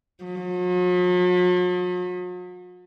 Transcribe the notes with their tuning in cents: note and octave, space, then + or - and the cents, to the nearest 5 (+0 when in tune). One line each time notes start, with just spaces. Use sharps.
F#3 -45